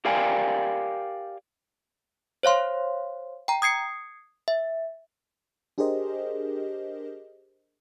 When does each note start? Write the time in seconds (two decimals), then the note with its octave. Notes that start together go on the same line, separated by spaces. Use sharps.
0.05 G4 A#4 D5 F5 G5 G#5
2.43 C5 C#5 F5 C6
3.48 G5 A#5
3.62 D#6 G#6 C7 C#7
4.48 E5
5.78 D4 G4 G#4 A#4 C5 D#5